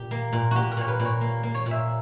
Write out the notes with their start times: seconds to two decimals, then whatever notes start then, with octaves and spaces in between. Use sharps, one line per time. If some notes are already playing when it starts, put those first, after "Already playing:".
Already playing: A#2 G4
0.11 A#3
0.33 A#2
0.51 A#2 F#4 G4
0.72 A#4
0.77 A#2 C#5
0.88 B4
1.00 A#2
1.05 C#5
1.21 A#3
1.43 A#3
1.54 C#5
1.66 A#2
1.71 E5